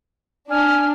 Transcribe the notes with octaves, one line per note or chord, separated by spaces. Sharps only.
D4 G#5 F6